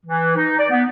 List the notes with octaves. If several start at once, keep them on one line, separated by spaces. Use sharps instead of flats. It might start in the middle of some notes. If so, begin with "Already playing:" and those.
E3
D#4
D5
B3